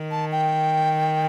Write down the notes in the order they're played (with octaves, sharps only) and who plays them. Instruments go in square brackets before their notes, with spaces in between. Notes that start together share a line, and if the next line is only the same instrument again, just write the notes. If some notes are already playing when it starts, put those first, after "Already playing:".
Already playing: [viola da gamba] D#3
[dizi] A5
G5